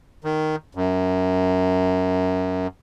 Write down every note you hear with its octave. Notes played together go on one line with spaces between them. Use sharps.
D#3
F#2